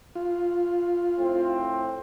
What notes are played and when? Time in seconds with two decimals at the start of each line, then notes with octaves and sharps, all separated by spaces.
0.15 F4
1.18 A2 C4